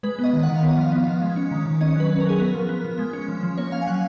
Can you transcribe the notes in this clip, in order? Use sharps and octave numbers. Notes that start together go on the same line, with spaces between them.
G#3 B4
B3
D#5
D#3
F#5
D#3
F5
B3
D#5
F3 F5
B3
F3
G#3
C#4
D#3
D#3
C#4 D#5
F#3 B4
C#4
A#4
F#3 G#4
B3 A#4
F3
B3
F3
G#3
C#4
F3
F3
A#3 C#5
C#4 F5
G#5
F#3 F#5